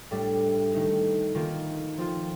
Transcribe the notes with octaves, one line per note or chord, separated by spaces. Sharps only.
A2 G3 D4
D#3 A3 D#4
D#3 A#3 F4
F3 C4 F4